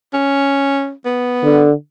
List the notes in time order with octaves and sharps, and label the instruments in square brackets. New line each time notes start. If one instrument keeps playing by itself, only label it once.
[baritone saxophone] C#4
B3
[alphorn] D3